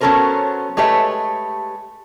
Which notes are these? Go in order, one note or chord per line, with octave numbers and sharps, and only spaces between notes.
F#3 B3 C#4 A4 A#4 C5
G#3 A3 G4 B4 C#5 E5